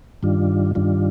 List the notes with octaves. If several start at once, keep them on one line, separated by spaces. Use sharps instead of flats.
G2 D#3 G3 D4 F4
G2 D#3 G3 D4 F4